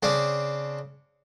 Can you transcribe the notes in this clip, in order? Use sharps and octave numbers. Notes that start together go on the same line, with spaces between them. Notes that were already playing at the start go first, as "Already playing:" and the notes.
C#3 C4 D4